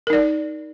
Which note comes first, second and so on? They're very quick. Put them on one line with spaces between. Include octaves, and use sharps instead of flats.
A#4 D#4 D5